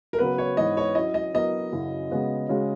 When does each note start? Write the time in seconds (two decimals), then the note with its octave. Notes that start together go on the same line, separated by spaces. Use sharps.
0.13 A#4
0.18 C#3 F#3 B3 F#4 B4
0.38 C#5
0.57 G#2 E3 B3 D#5
0.77 C#5
0.95 F#3 C#4 E4 D#5
1.14 D#5
1.34 F#3 B3 E4 A#4 D#5
1.72 F#2 C#3 F#3 C#4 E4
2.10 C#3 G#3 B3 F#4
2.49 C#3 G#3 C#4 F#4